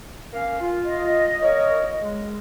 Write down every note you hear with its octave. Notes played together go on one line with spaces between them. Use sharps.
A#3 C#4 F5
F4
D#5
A#3 A#4 C#5
G#3